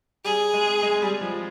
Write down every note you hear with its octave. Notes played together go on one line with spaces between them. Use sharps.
G3 G#4
G#3
G#3
G3
F3